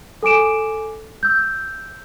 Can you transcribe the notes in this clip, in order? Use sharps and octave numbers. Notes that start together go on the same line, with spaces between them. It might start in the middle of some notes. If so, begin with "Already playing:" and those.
A4 G#5 D6 D7 E7
E6 G6